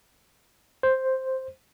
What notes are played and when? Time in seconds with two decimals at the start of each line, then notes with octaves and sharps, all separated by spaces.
0.83 C5